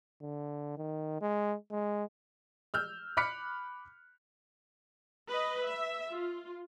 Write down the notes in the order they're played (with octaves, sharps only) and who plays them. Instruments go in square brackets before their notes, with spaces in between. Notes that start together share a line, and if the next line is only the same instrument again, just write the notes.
[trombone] D3
D#3
G#3
G#3
[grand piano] E6 F6 G6
B5 D6 F6 F#6 B6 C#7
[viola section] B4 D#5
E5
F4